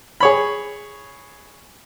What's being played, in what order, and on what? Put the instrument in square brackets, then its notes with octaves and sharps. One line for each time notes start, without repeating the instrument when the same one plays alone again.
[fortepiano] G#4 C#5 B5